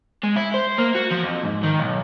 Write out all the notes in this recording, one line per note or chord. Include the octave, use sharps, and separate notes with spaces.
G#3
E4
C5
A#3
F#4
F3
F2
G#2
D#3
B1